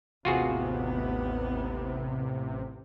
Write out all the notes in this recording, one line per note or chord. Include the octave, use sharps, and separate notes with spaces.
A1 D#2 C3 B3 F4 F#4 G#4